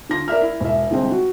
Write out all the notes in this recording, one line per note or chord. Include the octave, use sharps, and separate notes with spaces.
D3 F4 A#6
A#4 D5 E5 F6
E4
E1 E5
C2 D3 G#3 C4
F#4